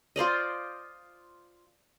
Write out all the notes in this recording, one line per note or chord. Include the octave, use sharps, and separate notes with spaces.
F4 C5 D5 D#5